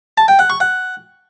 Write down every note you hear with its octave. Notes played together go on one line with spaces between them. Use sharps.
A5
G5
F#5
C#6
F#5